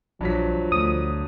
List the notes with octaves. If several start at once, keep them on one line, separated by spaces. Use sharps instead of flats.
A#1 G2 F3 F#3 B6
D2 D#6